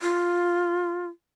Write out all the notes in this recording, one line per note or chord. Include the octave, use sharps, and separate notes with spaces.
F4